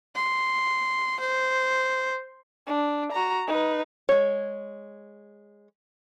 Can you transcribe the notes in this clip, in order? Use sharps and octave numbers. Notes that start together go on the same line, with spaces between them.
C6
C5
D4
F#4 A#5
D#4 B4
G#3 C#5